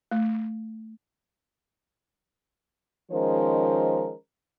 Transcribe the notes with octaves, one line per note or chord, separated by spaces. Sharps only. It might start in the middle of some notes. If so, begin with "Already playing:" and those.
A3
D#3 F3 G#3 C#4 A#4 C5